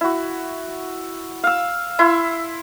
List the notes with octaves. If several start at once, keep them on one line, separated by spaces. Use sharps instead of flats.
E4 F#4
F5 E6
E4 C6